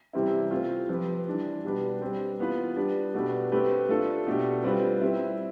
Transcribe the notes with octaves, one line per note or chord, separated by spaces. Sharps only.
C3 E3 G3 C4 E4
A3 C4 F4
F3 C4 G4 B4
E3 G3 D4
B2 G3 D4 G4 B4
G3 C4 G4 B4
E3 B3 F4 B4
G3 D4 G4 B4
B2 A3 D4 G4 B4
A3 C4 G4 B4
A3 D4 F4 A4
B2 A3 D4 G4
G3 C4 F4 B4
G3 C4 E4